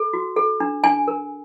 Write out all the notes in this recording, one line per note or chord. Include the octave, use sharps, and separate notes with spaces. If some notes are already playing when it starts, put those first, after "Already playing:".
Already playing: A4
F#4
A4
D4
D4 G#5
A#4